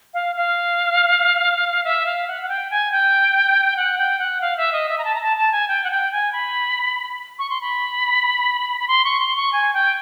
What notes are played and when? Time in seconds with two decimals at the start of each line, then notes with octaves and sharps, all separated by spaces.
0.14 F5
0.36 F5
1.84 E5
2.06 F5
2.27 F#5
2.41 F#5
2.49 G5
2.71 G#5
2.92 G5
3.77 F#5
3.98 G5
4.19 F#5
4.41 F5
4.57 E5
4.73 D#5
4.89 E5
4.98 A#5
5.05 A5
5.15 A#5
5.21 A5
5.37 A5
5.52 G#5
5.68 G5
5.84 F#5
5.90 G5
6.12 G#5
6.33 B5
7.39 C#6
7.50 C6
7.61 B5
8.80 B5
8.88 C6
9.05 C#6
9.20 C6
9.36 C#6
9.53 G#5
9.74 G5